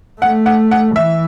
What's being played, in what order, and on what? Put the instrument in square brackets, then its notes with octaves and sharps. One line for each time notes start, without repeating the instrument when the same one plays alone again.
[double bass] A3 [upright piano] F#5
[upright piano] F#5
F#5
[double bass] E3 [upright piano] E5